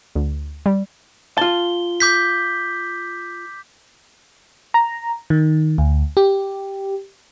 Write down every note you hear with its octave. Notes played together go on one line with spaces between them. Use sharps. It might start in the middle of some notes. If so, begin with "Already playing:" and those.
D2
G3
F4 A5 G7
D6 G6 B6
A#5
D#3
D2
G4